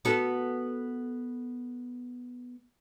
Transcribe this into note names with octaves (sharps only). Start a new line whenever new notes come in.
B3 F#4 A4